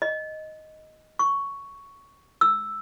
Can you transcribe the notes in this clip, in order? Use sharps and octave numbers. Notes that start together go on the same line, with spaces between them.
D#5
C#6
E6